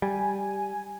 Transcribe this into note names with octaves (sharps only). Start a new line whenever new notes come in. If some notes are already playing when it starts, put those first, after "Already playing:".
G3 G#5